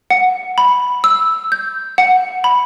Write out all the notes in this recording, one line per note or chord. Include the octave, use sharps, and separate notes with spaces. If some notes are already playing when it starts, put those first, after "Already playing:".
F#5
B5
E6
G6
F#5
B5